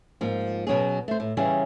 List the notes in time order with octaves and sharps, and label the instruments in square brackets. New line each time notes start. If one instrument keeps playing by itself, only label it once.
[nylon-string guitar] G#2 F3 A#3
B2 F#3 C#4 G#4
A3 C5
A2
C#3 E3 G3 C#4 G#4 G#5